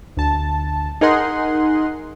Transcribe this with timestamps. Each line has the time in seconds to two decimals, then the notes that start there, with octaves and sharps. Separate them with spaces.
0.17 D2 A5
1.01 D#4 G#4 A#4 D#5 F#5 C6